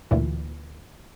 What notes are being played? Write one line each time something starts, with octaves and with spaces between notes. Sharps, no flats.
A1 D2 A#2 E3